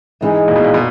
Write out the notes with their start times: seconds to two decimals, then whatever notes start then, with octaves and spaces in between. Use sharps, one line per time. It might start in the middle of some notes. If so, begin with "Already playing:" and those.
0.21 G#2 E3 G#3 D#4 G#4
0.48 A#2
0.56 B2
0.64 A#2
0.74 B2